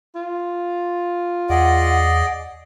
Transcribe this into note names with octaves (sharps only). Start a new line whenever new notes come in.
F4
E2 G#4 D5 D#5 F#5